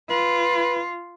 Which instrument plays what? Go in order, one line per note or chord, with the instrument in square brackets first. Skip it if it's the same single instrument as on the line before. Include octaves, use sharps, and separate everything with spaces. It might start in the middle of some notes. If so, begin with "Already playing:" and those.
[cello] F4 [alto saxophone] B4